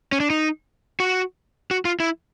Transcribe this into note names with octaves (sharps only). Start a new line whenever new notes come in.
C#4
D4
D#4
F#4
F#4
F4
E4